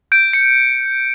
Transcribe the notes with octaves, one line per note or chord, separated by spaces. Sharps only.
G6 D7
C#7